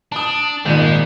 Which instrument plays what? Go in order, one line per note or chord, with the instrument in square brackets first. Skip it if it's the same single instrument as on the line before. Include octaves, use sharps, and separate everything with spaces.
[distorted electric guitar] D4 [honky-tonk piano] A5 D#6
[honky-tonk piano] G#1 D5 C#7 [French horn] A#2 [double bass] D#3 [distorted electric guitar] G#3